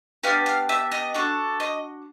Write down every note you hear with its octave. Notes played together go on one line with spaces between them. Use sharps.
B3 D4 G4 F5
F5
E5
D#5
D4 F#4 A4
D#5